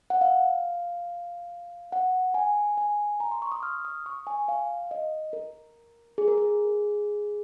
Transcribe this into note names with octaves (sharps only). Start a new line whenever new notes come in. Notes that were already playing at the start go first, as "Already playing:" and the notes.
F#5
F5
F#5
G#5
G#5
A#5
C6
C#6
D#6
F6
D#6
C#6
G#5
F5
D#5
A#4
G#4
A#4
G#4